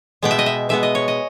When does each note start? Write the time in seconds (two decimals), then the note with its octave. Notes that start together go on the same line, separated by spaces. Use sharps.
0.23 B2 G#3 B3 G5
0.31 E5
0.39 D#5
0.46 E5
0.69 B2 G#3 B3 E5
0.83 D#5
0.95 C#5
1.08 D#5